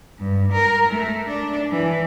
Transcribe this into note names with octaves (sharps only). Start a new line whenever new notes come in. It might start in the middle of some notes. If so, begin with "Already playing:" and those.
G2
A#4
A3
D4
E3